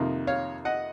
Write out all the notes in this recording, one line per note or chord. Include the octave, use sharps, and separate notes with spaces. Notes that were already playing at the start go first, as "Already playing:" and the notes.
Already playing: F2 C3 D#3 A#3 D#4
C#5 F5
D#5 F#5